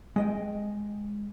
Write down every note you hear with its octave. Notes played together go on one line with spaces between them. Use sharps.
G#3 D#5 G5